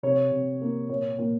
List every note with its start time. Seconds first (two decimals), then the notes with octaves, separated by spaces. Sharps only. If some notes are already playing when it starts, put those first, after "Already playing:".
0.03 C3 C#5
0.32 C3
0.61 A#3
0.89 A#2 C#5
1.18 A#2